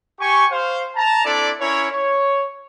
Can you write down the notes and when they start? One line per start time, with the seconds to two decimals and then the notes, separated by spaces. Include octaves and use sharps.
0.19 G4 G#5 C#6
0.51 C5 F5
0.96 A5 A#5
1.25 C4 D4 E4 A4 D5
1.59 C#4 E4 A#4 C#5
1.91 C#5